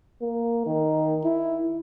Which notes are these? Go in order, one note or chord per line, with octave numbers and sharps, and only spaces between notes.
A#3
D#3
E4